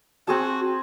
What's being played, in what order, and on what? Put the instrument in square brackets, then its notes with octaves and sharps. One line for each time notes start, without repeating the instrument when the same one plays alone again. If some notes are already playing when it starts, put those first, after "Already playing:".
[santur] C4 G#4 A5 [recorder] F#4